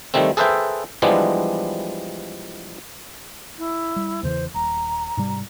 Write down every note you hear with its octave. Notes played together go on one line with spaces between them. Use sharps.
D#3 G3 A3 C4
G#4 A4 B4 C5 E5 G5
E3 F3 G3 G#3 B3 D4
E4
G3
E2 C#3 E3 C5
D#1 A#5
G#2 C3 G3